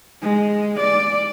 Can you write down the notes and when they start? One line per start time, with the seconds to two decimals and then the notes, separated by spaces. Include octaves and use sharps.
0.23 G#3
0.80 D5